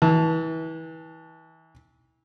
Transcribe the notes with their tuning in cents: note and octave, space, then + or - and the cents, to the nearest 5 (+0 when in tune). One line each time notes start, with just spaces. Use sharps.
E3 -30 A5 -10